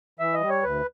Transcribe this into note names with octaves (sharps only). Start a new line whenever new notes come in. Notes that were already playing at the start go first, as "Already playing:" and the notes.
E3 E5
D#5
G3
C#5
D2 B4